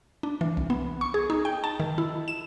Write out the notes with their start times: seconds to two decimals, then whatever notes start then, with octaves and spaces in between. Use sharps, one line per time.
0.23 D4
0.41 E3
0.57 C2
0.70 B3
1.01 C#6
1.14 G#4
1.30 D#4
1.45 G5
1.64 A5
1.80 D#3
1.98 E4
2.28 E7